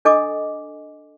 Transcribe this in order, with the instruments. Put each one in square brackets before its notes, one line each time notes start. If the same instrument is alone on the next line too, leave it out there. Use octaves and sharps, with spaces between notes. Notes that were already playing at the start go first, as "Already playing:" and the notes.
[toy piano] D4 A4 D#5 G#5 D6